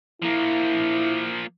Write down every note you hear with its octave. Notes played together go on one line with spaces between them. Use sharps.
F3 A#3 E4